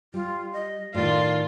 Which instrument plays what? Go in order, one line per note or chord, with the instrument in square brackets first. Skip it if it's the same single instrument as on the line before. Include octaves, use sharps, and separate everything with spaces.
[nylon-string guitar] G3 [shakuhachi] F4
[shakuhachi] D#5
[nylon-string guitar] A2 D#3 [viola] F4 [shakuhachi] D5